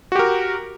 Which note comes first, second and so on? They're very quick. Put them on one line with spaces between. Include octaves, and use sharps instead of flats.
F#4 G4 A#4